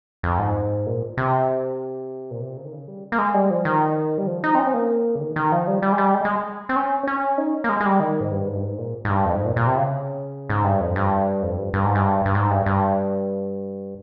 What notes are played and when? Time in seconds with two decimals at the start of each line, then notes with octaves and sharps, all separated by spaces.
0.23 F2
0.39 G#2
0.86 A#2
1.17 C3
2.31 A#2
2.42 C3
2.57 C#3
2.65 D#3
2.73 C#3
2.88 G3
3.12 A#3
3.18 G#3
3.34 G3
3.50 F3
3.65 D#3
4.18 G3
4.27 F3
4.44 D#4
4.55 C4
4.59 C#4
4.66 C4
4.74 A#3
5.15 C#3
5.21 D#3
5.36 D#3
5.52 F3
5.67 G3
5.82 G3
5.92 G#3
5.98 G3
6.14 G#3
6.25 G#3
6.69 C4
6.76 C#4
7.07 C#4
7.38 D#4
7.64 A#3
7.69 G#3
7.80 G#3
7.86 G3
8.00 D#3
8.21 G#2
8.31 G2
8.47 G#2
8.55 G2
8.62 G#2
8.78 A#2
9.05 G#2
9.09 G2
9.25 F2
9.35 G#2
9.46 A#2
9.56 A#2
9.67 C3
9.77 C#3
10.50 G#2
10.64 G2
10.80 F2
10.96 G2
11.43 F2
11.58 G2
11.73 G2
11.85 G#2
11.95 G2
12.25 G2
12.35 G#2
12.50 G2
12.66 G2